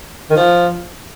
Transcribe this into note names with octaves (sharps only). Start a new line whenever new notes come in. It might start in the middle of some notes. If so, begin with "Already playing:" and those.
D#3
F3